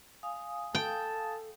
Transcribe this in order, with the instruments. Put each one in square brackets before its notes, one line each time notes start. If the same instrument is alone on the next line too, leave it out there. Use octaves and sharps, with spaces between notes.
[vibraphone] F5 G#5 D#6
[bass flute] A4 [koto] G5 [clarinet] A5